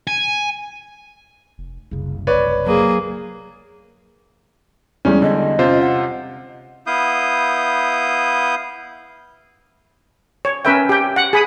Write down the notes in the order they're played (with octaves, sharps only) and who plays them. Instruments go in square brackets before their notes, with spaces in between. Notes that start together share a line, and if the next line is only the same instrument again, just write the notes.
[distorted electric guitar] G#5
[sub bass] F1
[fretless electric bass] F#1 C2 [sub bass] C#3
[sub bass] A#1 [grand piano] B4 C#5 D5
[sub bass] F#3 [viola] A#3 G#4
[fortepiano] E2 G3 G#3 [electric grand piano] C#4
[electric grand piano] D3 [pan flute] D#5
[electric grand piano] C3 F4 C5 [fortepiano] C#4
[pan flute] F#5
[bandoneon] B3 E4 F5 D#6 G6
[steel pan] C#5
C#4 A#4 B4 E5 G5
G4 G5
F#5
G#4 B5 D#6